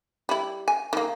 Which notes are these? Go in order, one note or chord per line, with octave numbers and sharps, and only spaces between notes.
G3 E4
G#5
D#3 A#3